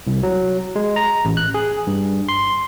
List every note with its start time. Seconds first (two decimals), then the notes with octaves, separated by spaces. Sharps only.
0.07 C2
0.23 F#3
0.76 G#3
0.96 A#5
1.25 A1
1.37 F#6
1.54 G#4
1.87 G2
2.29 C6